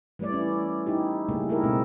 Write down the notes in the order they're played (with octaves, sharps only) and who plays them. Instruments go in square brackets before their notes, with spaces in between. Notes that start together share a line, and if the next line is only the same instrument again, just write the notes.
[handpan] E3 G3 A3 C#5 D5
C#4 E4
D#4 E4 G4
C#3 G3 A3 A#3 C#4
D#4 E4 G4 A4 A#4
B2 G#3 A3 C4